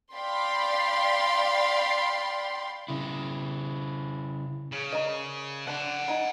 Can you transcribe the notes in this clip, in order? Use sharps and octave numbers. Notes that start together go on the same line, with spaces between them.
D5 F5 G5 B5 C6
C#3 E4
C#3
A#4 D5 D#5
D4 F#5 A5
D#4 G#5 B5